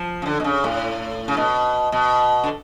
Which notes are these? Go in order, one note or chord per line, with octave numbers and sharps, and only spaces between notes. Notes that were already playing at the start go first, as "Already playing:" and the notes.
Already playing: F3
C#3
D3
B2
C#3
A2
C#3
B2
B2
D3